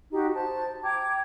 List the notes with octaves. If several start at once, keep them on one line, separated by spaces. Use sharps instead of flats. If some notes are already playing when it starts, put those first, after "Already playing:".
D#4 F#4 G4
C5 A5
G5 A#5 D6 G#6